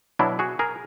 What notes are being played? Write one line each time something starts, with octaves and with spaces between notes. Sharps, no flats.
B2 F#3 D4 E4
F#4 G#4
G#4 A#4